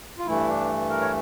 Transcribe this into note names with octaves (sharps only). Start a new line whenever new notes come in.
F4
G2 E3 A3 E4
D4
A#4
C#5